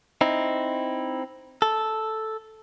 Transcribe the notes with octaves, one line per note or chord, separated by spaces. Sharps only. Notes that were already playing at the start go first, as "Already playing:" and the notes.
C4 D#4 E4
A4